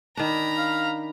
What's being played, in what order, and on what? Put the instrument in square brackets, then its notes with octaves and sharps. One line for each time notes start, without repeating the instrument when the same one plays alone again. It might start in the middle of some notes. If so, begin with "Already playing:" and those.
[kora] D#3 D4 [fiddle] A#5 B5
[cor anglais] F5